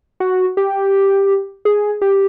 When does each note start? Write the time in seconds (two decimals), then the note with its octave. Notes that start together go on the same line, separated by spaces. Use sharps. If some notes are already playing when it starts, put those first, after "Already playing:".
0.20 F#4
0.57 G4
1.65 G#4
2.02 G4